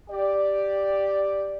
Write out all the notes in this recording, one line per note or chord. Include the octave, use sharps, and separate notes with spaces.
G4 D5